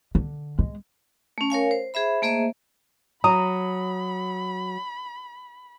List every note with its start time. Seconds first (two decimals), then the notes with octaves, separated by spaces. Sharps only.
0.15 D3
0.59 G#3
1.38 A3 C#4
1.50 A#4 C#5 F5 G#5
1.71 C5
1.94 G#4 C5 E5 B5
2.22 A3 A#3 G#4 C5 D#5 E5
3.24 F#3 A#5 B5 D#6